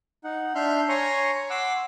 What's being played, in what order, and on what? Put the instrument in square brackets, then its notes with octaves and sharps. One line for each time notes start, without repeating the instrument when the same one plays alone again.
[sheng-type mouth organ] D#4 F#5
D4 E5 C6 F6 G6
C#5 G#5 A#5 C6 C#6
F#5 C6 D6 E6